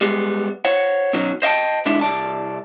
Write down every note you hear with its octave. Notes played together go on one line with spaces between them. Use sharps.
G3 G#3 B3
C5 C#5 F#5
B2 D#3 F#3 C#4
C5 D#5 E5 G5 A5
G#2 D3 G#3 D4 E4
C2 F#3 D5 A5